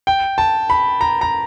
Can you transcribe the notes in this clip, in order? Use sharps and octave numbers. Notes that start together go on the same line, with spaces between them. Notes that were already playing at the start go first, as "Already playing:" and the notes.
G5
A5
B5
A#5
A#5